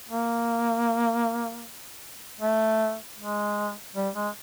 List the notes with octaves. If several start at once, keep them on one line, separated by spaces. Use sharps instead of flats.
A#3
A3
G#3
G3
G#3